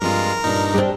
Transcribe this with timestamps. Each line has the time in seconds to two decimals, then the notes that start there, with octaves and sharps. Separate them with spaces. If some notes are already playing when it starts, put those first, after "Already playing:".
0.01 G2 F3 G#3 C4 F4 A#4
0.44 G2 A#2 D4 D#4
0.74 G3 C4 D4 G4